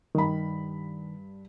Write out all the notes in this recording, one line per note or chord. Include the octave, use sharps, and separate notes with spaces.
G2 D#3 B5